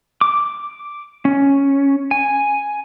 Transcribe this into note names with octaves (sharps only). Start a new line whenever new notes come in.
D6
C#4
G#5